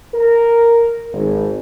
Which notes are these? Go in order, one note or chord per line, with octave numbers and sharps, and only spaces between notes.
A#4
G#1